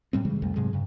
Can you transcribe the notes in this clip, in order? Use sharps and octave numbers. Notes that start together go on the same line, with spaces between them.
A2 G3 C4
C#3 E3 G3 G#3
C2 F2 G3 A3
G#2 C3 F#3 G#3
G2 C#3